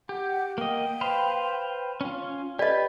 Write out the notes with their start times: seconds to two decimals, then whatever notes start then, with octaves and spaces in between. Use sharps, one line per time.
0.09 G4 F#5
0.58 A#3 D#5 G5
1.01 B4 C5 F5
2.01 C#4 F4
2.59 G4 B4 D5 D#5